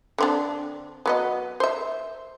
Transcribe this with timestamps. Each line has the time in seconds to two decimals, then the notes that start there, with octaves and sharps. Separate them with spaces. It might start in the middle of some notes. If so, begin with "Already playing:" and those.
0.18 D3 C4 D4
1.06 F#3 B3 D#5
1.60 C5 E5